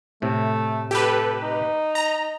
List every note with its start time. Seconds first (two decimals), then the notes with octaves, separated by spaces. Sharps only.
0.22 A2 C3 A3
0.91 G4 A4 B4
1.43 D#4
1.95 A#5